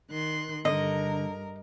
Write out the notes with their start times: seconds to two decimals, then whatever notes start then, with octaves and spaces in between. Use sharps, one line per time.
0.10 D#3 C6 F#6
0.65 G2 D3 A#4 D#5